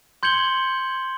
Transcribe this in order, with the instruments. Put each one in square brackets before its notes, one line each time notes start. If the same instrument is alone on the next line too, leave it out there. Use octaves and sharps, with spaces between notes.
[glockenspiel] C6 G6 G#6 C#7 F#7 G7